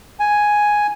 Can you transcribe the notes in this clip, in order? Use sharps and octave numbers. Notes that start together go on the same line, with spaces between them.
G#5